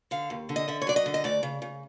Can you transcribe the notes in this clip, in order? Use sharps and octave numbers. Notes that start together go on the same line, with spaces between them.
D3 F5
D#2
D3
D#5
D3 E5
C#5
F#3 D5
D#5
D3
D#5
D2 D5
C#3
C#3